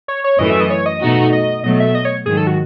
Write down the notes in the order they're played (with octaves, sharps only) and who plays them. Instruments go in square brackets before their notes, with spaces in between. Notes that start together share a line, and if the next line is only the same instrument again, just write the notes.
[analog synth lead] C#5
C#5
[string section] F#2 E3 A3 [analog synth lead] D#5
[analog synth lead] E5
D#5
C#5
D#5
[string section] B2 A3 D#4 F#4
[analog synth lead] D#5
[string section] B2 F#3 A3 [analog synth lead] D#5
[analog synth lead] E5
D#5
C#5
[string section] G#2 D#3 F#3 [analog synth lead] G#4
[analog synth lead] A4
F#4